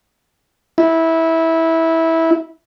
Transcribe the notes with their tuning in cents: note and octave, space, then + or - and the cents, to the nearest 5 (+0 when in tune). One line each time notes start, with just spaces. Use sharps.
E4 -15